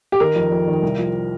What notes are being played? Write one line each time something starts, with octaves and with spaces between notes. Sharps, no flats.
G4
D#3 A#4
F2
F2
D#3
C2
F3